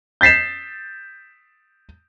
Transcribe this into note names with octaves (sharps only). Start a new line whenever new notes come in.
G6 A6 B6 C7 E7